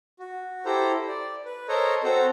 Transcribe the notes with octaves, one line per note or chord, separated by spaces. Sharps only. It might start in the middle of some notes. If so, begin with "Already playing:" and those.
F#4
E4 G4 A4 C5 A#5
D5
B4
A4 A#4 C5 C#5 D#5 A#5
C4 F#4 A4 C5 A#5